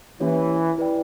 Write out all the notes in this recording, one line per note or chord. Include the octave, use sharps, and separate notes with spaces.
E3 A#3 C#4 E4 G4 C#5
E4 B4 D5 G5